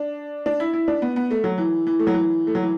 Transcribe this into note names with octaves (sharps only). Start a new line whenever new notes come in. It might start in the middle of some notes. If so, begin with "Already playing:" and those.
Already playing: D4
D4
E4
E4
D4
B3
B3
A3
F#3
E3
E3
A3
F#3
E3
A3
F#3
E3